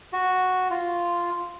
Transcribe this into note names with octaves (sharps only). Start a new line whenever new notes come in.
F#4
F4